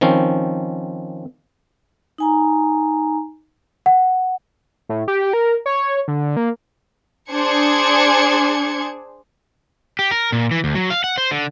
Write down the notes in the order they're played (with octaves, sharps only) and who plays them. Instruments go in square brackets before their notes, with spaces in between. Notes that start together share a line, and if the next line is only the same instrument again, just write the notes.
[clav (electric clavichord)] D#3 F3 C4 C#4
[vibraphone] D#4 G#5 A#5
[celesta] F#5
[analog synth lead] A2
G4
A#4
C#5
D3
A#3
[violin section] D4 G#4 C5 G#6 C#7
[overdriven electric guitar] G4
A#4
A#2
E3
D2
F#3
F5
F#5
C5
D3